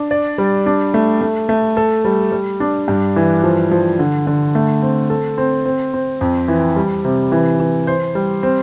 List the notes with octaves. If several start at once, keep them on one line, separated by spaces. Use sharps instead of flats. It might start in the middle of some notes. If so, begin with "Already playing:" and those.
Already playing: D4
D5
G3
D4
A3
A3
A3
A4
G3
G3
D4
G2
E3
F3
F3
D3
D3
A3
C4
A4
C4
C4
C4
F2
E3
G3
C3
E3
E3
C5
G3
C4